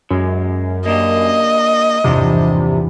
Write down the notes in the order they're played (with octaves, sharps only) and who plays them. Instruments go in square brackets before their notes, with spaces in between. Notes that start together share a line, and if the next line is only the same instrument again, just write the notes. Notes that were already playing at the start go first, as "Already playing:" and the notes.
[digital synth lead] F#2 [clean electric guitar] F#3 G#3
[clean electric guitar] A#3 D4 G4 [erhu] D#5
[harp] G1 E2 G#2 [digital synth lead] C3 [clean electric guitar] F3 D4 C5